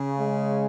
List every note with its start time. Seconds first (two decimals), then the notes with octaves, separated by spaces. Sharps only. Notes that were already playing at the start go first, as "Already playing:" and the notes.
Already playing: C#3
0.19 G#3